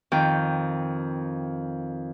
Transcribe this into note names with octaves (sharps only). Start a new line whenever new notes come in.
F2 D#3 G5